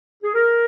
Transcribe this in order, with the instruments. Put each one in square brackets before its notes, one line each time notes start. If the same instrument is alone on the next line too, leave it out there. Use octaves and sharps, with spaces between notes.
[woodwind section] G#4
A#4